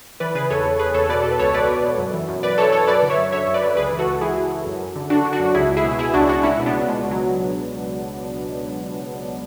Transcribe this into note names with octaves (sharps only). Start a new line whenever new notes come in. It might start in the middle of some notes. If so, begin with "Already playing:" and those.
E3 B4 D5
C#3 G#4 B4
E2 A4 C#5
E2
C#3 G#4 B4
E2 A4 C#5
B2 B4 D5
B2 A4
B4
C#2 A4 C#5
B2 B4 D5
B2
B2
F#2
E3
F#2
F#2 B4 D5
E3 A4 C#5
F#2 A4 C#5
F#2 B4 D5
D3
C#5 E5
F#2
D3 C#5 E5
F#2
B4 D5
D3
C#2 G#4 B4
E3
F#4 A4
C#2
E3 E4 G#4
E3
E3
F#2
F#2
D3
D3 D4 F#4
D3
D4 F#4
F#2
C#2 E4 G#4
C#2
E4 G#4
B2
B2 E4 G#4
C#2 D4 F#4
C#2 D4 F#4
C#2 C#4 E4
B2
B3 D4
C#2
C#2 G#3
B2
F#3